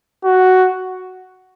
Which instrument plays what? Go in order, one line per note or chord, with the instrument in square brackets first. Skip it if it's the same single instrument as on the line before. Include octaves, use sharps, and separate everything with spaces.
[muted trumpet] F#4